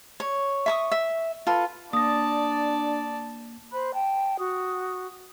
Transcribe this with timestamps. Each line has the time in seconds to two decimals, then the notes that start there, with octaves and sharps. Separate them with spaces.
0.20 C#5
0.66 E5 C#6 D#6
0.92 E5
1.47 F4 A4 B4
1.93 A#3 D4 D5 A5 D#6 A#6
3.71 C5 B5 F#6
3.93 G5 A5
4.38 F#4 D#6